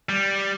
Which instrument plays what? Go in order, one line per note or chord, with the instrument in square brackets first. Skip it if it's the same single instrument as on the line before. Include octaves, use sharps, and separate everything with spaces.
[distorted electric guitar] G3